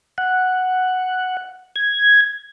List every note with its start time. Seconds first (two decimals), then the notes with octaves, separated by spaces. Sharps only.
0.18 F#5
1.76 G#6